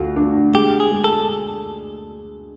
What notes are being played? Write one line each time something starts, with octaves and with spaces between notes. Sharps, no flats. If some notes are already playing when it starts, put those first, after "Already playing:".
Already playing: D2 F4 F#4
D4
G#3 G4
G#4
G#3
A4